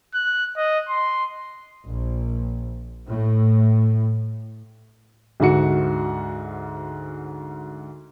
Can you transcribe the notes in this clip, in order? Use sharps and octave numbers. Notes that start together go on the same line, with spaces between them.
F#6
D#5
C6
A#1
A2
D2 G#2 F#4 C#7